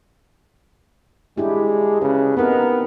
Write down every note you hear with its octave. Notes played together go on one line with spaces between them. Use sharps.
G#3 D4 E4 G4
C#3 B4
B3 C4 D#4 A#4